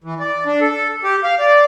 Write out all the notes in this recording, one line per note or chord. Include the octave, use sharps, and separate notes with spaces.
E3
D5
D4
A4
G4
F5
D5